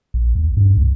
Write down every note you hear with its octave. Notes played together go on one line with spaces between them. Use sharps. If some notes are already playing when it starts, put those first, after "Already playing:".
A#1
D#2
G2
C#2